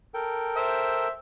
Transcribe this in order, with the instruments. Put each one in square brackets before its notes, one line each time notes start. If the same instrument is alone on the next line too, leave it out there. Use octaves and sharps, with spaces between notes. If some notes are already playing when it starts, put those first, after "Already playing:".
[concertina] A4 A#4 G5
[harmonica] C5 E5